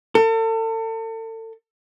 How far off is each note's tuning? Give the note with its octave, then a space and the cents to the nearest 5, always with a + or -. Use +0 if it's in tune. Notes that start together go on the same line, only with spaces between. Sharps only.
A4 +35